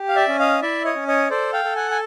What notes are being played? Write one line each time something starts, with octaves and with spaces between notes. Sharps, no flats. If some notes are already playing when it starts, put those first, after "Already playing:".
Already playing: G4
F5
D5 E5
C#4
D#5 F5
E4 D5 E5
C#5 D#5
C#4
C#5 D#5
A4 C5 D5
F5 G5
A4
F#5 G#5
G#5